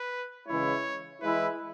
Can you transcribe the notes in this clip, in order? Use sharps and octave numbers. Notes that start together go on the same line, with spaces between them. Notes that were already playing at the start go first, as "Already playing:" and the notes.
Already playing: B4
C#3 E3 G#3 E4 C#5
E3 G#3 E4 B4